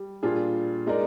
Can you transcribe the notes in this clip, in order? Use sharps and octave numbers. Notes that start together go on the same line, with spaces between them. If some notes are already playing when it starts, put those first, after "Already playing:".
Already playing: G3
A#2 G3 D4 F4 G#4
G#3 D#4 A#4 D5